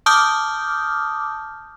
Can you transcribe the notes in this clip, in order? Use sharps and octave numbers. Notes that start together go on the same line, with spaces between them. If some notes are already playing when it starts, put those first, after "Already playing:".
A5 D6 D#6 F6 G6